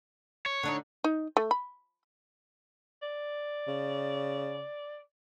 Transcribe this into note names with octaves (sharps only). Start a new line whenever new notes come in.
C#5
D3 D4 D#4
D#4
A3
B5
D5
C#3